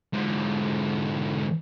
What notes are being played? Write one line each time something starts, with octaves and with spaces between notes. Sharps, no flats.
G#2 D3